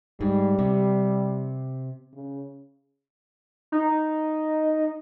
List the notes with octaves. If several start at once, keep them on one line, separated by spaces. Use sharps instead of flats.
G#2 G3
C3
C#3
D#4